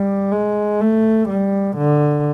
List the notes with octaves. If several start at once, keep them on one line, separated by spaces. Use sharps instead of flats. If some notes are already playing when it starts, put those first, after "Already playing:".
Already playing: G3
G#3
A3
G3
D3